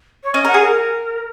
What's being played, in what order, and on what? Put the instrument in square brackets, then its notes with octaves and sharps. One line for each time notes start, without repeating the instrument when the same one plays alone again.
[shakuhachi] C#5
[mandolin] C#4 [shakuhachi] D#5
[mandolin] A#4 [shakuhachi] F#5
[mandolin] G#4
[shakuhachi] A#4